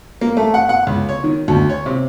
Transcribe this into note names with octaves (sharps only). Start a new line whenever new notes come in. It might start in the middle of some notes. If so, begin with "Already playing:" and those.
A#3
A3
F#5
F#5
C#2
C#5
D#3
D2
C#5
C3